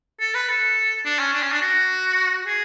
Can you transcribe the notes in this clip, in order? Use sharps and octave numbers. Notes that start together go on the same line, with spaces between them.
A4
B4
A4
D4
C#4
D4
C#4
D4
F#4
G#4